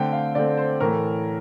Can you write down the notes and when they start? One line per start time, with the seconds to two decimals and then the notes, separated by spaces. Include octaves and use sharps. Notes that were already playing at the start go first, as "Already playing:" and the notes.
Already playing: D3 A3 C4 G5
0.13 F5
0.35 D3 A3 C4 D5
0.57 C5
0.80 A2 E3 A3 A#4